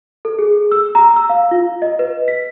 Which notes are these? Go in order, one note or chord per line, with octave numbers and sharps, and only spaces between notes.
A4
G#4
E6
A#5
E6
F5
F4
D#5
B4
B6